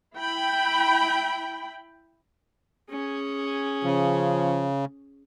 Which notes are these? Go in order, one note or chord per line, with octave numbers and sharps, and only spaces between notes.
E4 G5 B5
C#4 G#4
C#3 F3